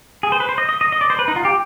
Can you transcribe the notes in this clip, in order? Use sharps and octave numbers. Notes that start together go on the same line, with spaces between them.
G#4
C5
B4
C5
D#5
D#5
D#5
D#5
D5
C5
B4
D#4
F4
G4